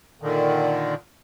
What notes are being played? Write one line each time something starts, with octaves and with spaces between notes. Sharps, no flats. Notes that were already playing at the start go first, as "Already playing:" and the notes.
A#2 D3 D#3